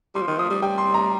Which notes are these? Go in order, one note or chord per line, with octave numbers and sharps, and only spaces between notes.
G3 C6
F3
D#3
F3 D#6
G3
G3 G5
C6
A#5